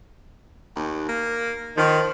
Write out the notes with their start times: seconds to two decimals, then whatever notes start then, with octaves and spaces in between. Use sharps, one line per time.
0.76 D#2
1.09 A#3
1.77 D#3 F3